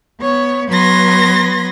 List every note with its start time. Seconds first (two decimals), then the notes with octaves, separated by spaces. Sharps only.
0.21 B3 C#5
0.69 F#3 B3 B4 C6 G#6 A#6